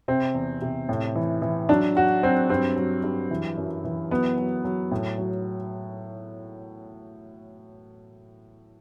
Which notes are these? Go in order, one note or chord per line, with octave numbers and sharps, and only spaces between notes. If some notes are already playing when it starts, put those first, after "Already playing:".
C3 C4
E2
C3
A2
E3
E3
F#3 D4
F#3 F#4
F#3 C4
G2 C4
F#3
G2
E3
F#2
E3
F#3 B3
F#3
F#3
A2
F#3